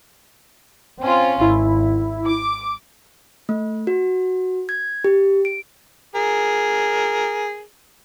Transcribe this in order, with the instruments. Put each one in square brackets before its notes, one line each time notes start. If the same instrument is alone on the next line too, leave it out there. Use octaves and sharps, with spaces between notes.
[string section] C4 C#4 F4
[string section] G#1 [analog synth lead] E4
[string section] D6
[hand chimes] A3
F#4
G#6
G4
D7
[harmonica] G#4 A#4